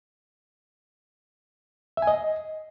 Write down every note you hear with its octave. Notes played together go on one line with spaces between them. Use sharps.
E5
G#5
D#5